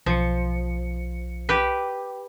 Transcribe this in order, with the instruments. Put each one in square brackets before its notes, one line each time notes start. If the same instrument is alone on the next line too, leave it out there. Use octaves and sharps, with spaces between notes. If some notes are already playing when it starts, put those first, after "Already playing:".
[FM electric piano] B1 C#7 [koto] F3
[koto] G4 B4